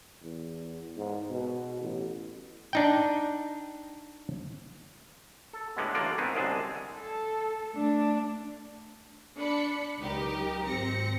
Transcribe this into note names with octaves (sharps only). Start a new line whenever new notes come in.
E2
G#2
B2
A1
D4 D#4 G5
A4
A2 D3 G3 G#3 B3
A1 D3 F#3 A#3 F4 D5
G#2 D#3 B3 C4 G#5
C2 F#2 D3 G#3 G#4 A5
A4
A3 D4
D4 B5 C#7
C#2 F#3 D#4 G4 A#4
G#1 C4 A#6 C#7